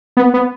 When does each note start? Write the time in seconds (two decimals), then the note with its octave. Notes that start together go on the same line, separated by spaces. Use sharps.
0.17 B3
0.34 B3